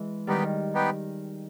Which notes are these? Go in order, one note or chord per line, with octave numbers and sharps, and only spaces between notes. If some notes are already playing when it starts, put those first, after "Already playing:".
Already playing: E3 G#3
D#3 G3 B3 D#4 G4 B4 G5
B3 D#4 G4 B4 G5